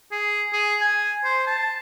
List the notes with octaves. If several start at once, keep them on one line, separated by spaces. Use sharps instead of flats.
G#4
G#4
G#5
C5
A5